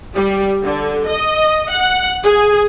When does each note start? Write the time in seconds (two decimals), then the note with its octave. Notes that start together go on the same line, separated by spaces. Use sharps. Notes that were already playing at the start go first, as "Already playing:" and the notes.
0.15 G3
0.63 D3
1.08 D#5
1.71 F#5
2.23 G#4